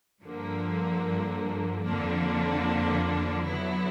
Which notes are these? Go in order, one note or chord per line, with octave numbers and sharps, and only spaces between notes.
G2 D3 F3 A#3
F2 D3 F3 A#3 D4
D3 F#3 B3 E4